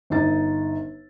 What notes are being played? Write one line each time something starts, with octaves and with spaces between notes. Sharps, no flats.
G1 D3 D#4 A6